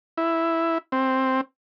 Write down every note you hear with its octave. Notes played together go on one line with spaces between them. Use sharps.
E4
C4